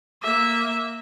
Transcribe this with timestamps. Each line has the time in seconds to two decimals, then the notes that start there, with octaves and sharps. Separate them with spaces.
0.23 A#3 E5